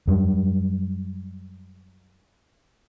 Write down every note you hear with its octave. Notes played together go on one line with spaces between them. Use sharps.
F#2 G3